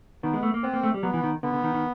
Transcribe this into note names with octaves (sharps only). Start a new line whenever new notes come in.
D#3 B3
G#3
A3
A#3
B3 C4
A#3
A3
G3
F#3 B3
E3
D#3
D3 B3
D3
D#3
D#3